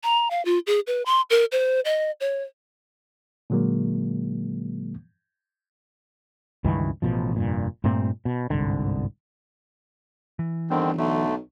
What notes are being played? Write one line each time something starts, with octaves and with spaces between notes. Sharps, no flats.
A#5
F5
F4
G#4
B4
C6
A#4
C5
D#5
C#5
A#2 D3 F#3 G#3 A#3
C#2 G2 D#3 E3
A1 B2 F3
F1 G2 A#2
G2 A#2 A3 C4
B2
G1 C2 G#2 D3
E3
G1 D3 D#3 C4
B1 D3 A3